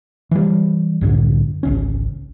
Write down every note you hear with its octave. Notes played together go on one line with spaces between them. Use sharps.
E3 G3
C2 F#2 A2 D3
G#1 C#2 C#4